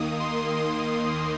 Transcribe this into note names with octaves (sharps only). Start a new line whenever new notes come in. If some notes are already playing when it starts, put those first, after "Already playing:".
Already playing: D#2 D#3 A#3 D#6
C6